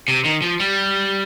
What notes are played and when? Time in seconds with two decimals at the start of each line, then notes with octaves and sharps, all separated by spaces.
0.08 C3
0.25 D#3
0.42 F3
0.60 G3